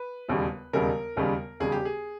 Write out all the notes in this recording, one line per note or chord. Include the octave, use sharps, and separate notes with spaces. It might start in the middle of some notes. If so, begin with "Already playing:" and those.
Already playing: B4
E1 D#2 C#3 G3
E1 D#2 C#3 G3 A#4
E1 D#2 C#3 G3
E1 D#2 C#3 G3 G#4
G4
G#4